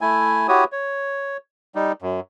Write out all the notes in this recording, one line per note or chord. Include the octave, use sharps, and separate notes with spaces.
A3 E4 G#5
E4 F#4 G4 C#5 D#6
C#5
G3 D#4
F#2